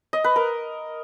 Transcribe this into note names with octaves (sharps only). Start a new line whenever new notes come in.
D#5
B4
A#4